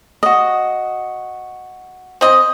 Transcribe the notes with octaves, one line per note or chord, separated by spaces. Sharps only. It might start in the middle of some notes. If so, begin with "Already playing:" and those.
F#4 D#5
C4 D#5